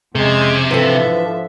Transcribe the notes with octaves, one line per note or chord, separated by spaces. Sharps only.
F2 C3 G#3 C#4 G#6
G#2 D3 E3 F3 A4 E5